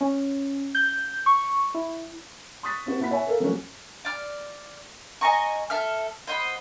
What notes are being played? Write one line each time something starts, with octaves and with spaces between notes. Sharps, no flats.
C#4
G6
C#6
E4
C6 C#6 D#6 F#6 A6 B6
C4 F#4 B4
A#2 E4 F#5 B5 B6
C#5 E5 G#5
A4 A#4 F5
F3 F#3 A3 A#3 C#4 F#4
D5 F6
D#5 G#5 A#5 C#6
A4 E5 F6
C5 D#5 F#5 B5